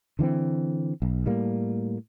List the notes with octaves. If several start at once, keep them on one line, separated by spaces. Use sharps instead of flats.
D3 E3 B3 C4
B1
A2 G3 A#3